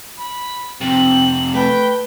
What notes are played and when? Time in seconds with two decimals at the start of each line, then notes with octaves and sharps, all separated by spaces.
0.17 B5
0.81 F2 C3 C4 F#7
1.54 A3 B4 G5